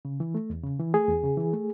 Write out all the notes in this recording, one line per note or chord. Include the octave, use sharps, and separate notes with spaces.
C#3
E3
A3
E2
C#3
E3
A3 G#4
E2
C#3
E3
A3